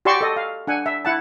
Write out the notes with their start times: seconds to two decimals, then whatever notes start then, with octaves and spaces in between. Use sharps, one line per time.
0.05 F#4 G4 D5 A5 C6 C#6
0.21 A4 D#5
0.36 F5
0.67 D4 F#5 G#5
0.86 E5
1.05 E4 F#5 A5